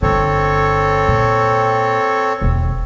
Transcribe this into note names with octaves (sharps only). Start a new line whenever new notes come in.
G1 D3 C4 A4 C#5
A#2
E1 D#2